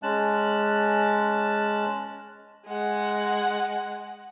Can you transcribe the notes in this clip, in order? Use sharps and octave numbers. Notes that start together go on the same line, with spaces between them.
G#3 C#4 A5 F#6
G#3 F#5